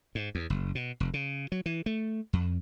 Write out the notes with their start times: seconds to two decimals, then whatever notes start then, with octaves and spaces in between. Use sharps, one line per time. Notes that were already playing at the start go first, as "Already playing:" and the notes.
0.15 G#2
0.35 E2
0.50 F#1
0.75 B2
1.00 F1
1.14 C#3
1.52 F#3
1.66 E3
1.86 A3
2.33 F2